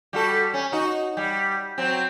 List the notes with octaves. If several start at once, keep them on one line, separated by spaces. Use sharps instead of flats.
G3 F#4 A4
C#4
D#4 F#4
G3
F#3 C4